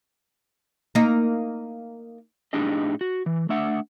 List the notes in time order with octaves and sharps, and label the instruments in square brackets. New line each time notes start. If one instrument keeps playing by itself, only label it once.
[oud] A#3 D#4
[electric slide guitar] A2 D4 D#4 G4 G#4 D#5
F#4
E3
A3 D4 E5 F#5